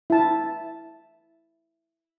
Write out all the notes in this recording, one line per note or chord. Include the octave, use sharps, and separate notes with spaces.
E4 A5